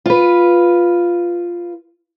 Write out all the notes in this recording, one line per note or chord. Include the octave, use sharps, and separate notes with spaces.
F4 B4